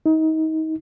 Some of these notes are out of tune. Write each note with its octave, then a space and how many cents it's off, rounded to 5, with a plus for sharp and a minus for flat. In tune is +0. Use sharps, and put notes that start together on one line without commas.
D#4 +30